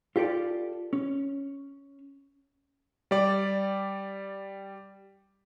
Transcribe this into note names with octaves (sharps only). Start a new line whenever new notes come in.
F4 G4 A4 D5
C#4
G3 D5